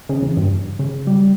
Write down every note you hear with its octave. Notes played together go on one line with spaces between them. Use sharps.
C#3
E2
G2
C#3
G3